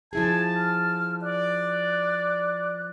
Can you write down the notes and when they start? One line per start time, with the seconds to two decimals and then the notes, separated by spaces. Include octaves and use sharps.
0.13 F3 E4 G#4 A5 G#6
0.56 F6
1.22 D5 F#6